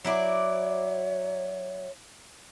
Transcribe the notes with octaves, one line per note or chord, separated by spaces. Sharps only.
F#3 E4 C#5 D5